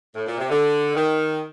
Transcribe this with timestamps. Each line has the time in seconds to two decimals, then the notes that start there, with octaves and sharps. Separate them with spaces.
0.14 A2
0.27 A#2
0.38 C3
0.50 D3
0.95 D#3